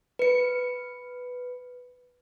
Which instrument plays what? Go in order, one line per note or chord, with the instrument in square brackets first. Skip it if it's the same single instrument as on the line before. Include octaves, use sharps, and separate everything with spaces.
[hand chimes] B4 C#7